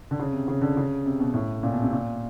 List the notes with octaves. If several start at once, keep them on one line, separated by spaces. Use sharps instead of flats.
D3
C#3
C3
C#3
D3
C#3
C3
B2
A2
A#2
B2
C3
A#2